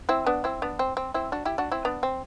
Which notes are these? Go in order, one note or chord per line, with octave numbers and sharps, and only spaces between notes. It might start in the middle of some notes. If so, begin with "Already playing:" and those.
C4 E4
B3 D4
C4 E4
B3 D4
C4
C4
C4 E4
D4 F#4
E4 G4
D4 F#4
C4 E4
B3 D4
C4